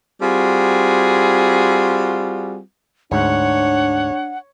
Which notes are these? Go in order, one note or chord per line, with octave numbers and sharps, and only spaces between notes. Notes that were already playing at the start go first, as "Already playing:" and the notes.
G3 C4 F4 F#4 G#4
D2 G#2 D4 C#5 F#5